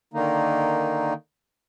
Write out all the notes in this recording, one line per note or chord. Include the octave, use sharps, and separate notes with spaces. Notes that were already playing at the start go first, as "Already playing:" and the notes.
D3 D#3 A#3 D#4